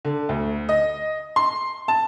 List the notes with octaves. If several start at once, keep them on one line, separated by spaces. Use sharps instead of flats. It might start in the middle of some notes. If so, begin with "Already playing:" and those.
D3
D2
D#5
C6
A5